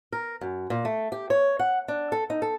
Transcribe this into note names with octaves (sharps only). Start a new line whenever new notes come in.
A#4
F#2
A#2
A3
G4
C#5
F#5
D4
A4
D#4
A4